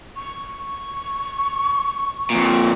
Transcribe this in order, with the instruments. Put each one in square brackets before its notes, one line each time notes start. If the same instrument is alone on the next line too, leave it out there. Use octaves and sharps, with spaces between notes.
[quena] C#6
[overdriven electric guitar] F2 A#2